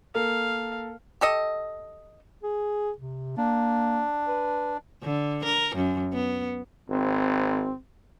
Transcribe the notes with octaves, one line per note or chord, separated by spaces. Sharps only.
A#3 A4 A#4 F5
G4 A4 D#5
G#4
C3
A#3 D4
B4
D3
A#4
F#2
B3
G#1 C4